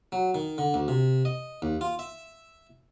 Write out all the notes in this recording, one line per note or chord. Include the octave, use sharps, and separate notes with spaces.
F#3
D#3
D3
D2
C3
D#5
D#2
F4
E5